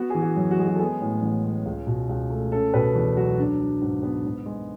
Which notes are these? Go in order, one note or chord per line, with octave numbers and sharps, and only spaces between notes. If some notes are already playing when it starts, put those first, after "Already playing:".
Already playing: B3 F#4
E3 G#4
F#4
F#2
F#4
G#3 G#4
F#4
A4
B3 G#4
A2
A1
G#3
C#2
B2
C#2
A3
C#4 A4
B2 B4
E2
F#3 F#4
D4
F#3
G#2
B3
G#2
G#3